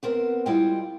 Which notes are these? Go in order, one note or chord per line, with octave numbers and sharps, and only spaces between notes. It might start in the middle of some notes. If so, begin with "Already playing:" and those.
B3 C4 A#4 B4 F#5
G3 G#3 E4 F4 D#5 G5